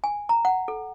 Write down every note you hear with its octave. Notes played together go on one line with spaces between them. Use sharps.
G#5
A#5
F#5
A4